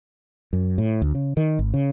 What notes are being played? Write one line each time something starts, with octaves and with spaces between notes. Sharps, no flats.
F#2
A2
D2
C#3
D#3
G#1
C#3